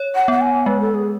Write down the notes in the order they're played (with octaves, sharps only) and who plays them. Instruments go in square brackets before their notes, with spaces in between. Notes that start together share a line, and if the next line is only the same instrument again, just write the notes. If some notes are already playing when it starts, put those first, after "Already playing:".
Already playing: [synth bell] C#5
[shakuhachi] F#5
[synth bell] B3 [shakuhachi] F#5
[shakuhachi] G#5
[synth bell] G#3 [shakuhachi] B4
[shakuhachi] A4
G#4